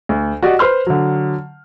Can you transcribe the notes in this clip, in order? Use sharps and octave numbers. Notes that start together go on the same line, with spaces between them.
D2
F#4 G4 D5 D#5 F#5
B4 C5 C6 F6
D3 F#3